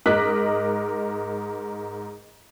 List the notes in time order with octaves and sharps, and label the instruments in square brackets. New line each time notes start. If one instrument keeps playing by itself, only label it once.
[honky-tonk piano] G#2 A#4 D#5 D6 F#6 B6